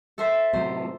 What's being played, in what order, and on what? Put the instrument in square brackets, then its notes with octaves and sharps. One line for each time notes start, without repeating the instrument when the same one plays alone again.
[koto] A4 C5 E5
[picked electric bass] A2 C3 F#3 [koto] C5